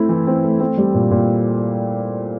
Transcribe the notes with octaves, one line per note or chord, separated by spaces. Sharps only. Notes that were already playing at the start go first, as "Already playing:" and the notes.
Already playing: A3 C4 E4
E3
C4
A3
C4
G3
A#2
A#2